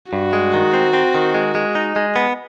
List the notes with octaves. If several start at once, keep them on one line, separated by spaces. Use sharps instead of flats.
G2 F#4
G#3
D#3
C4
C4
D#3
G#3
G#3
D#4
G#3
B3